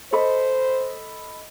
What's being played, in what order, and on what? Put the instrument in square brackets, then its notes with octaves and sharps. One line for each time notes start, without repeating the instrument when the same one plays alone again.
[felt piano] A4 D#5 B5 [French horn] C5